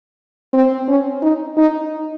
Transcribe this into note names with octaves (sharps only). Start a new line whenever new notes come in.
C4
C#4
D#4
D#4